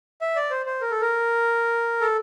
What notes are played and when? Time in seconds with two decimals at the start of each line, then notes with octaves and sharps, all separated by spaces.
0.21 E5
0.36 D5
0.51 C5
0.66 C5
0.81 A#4
0.91 A4
1.01 A#4
2.01 A4